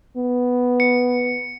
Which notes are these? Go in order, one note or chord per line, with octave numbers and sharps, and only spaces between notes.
B3
C#7